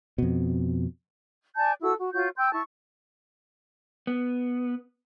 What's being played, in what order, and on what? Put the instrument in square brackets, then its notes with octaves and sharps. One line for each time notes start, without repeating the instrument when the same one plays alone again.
[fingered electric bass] F2 B2
[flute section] D5 G#5 A5 G6
E4 F#4 A4 E6
F#4
F4 F#4 C#5 G6
G5 C6 E6 G6
E4 A5 C#6
[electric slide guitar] B3